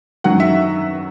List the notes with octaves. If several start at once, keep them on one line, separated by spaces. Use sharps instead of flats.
F#2 D#3 F#3 F#5
E5